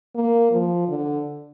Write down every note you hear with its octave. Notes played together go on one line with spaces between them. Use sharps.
A#3
F3
D3